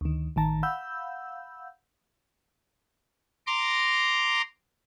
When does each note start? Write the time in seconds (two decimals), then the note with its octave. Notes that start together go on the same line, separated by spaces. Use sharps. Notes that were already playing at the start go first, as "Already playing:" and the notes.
0.01 D2 D#3
0.36 A1 D#3 A5 A#5
0.63 F5 F#5 B5 E6 G6
3.47 A#5 C6 D6